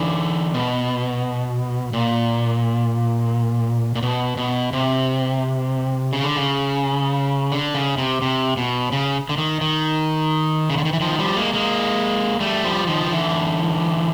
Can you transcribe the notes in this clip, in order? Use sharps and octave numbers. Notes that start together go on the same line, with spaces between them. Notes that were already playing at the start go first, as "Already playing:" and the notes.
Already playing: D3 E3
B2
A#2
A#2
B2
B2
C3
C#3
D3
C#3
D3
C#3
C3
C3
B2
C#3
D3
D#3
D#3
C#3
D3
D#3
E3
D#3 F3
F3 G3
G#3 A#3
G#3 A#3
G3 A3
F3 G3
D#3 F3
D#3
D3 E3